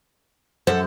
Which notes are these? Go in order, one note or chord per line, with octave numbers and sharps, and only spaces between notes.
F#2 A4 C5 F#5